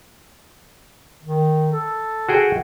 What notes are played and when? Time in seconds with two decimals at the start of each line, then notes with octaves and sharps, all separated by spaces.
1.23 D#3
1.71 A4
2.29 F#4 G#4 G5